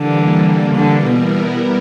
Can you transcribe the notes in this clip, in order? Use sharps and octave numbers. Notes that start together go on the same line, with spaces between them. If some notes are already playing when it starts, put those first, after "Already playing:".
Already playing: D3 E3 G3 A#3
D3
B2 G3 B3 E4 A#4